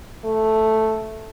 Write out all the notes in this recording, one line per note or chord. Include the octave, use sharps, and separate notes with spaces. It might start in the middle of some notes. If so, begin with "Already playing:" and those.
A3